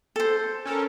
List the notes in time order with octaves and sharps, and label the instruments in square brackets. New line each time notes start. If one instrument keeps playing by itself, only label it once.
[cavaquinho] A4 C5
[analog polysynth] C#4 A4 A#4